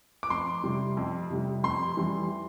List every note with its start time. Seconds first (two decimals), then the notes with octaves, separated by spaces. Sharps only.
0.23 D6
0.30 F2 C6
0.64 C3 G3
0.97 F2
1.30 C3 G3
1.63 F2 C6
1.97 E3 G3